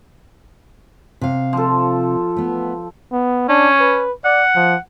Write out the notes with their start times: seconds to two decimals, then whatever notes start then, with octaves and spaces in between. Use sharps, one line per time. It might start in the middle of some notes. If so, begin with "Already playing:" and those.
1.21 C3 F5
1.53 F3 A4
2.37 A3 B3
3.12 B3
3.49 C#4 D4
3.80 B4
4.24 D5 F#5
4.55 F3